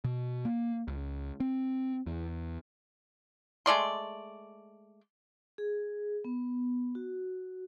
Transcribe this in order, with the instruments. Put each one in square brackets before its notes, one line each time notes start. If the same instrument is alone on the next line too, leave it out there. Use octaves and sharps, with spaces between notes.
[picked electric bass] B2
A#3
C#2
C4
E2
[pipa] G#3 A3 D5 C6
[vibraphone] G#4
B3
F#4